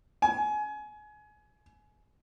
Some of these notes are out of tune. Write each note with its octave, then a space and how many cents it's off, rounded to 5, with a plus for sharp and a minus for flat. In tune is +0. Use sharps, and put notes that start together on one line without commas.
G#5 +25